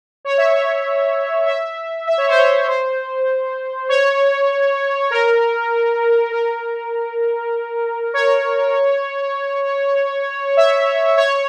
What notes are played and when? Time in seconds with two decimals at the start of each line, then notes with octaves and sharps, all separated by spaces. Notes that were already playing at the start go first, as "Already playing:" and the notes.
0.25 C#5
0.38 E5
0.51 C#5
1.46 E5
2.07 E5
2.18 C#5
2.28 C5
2.38 C#5
2.68 C5
3.89 C#5
5.11 A#4
6.32 A#4
8.14 C#5
10.57 E5
11.17 C#5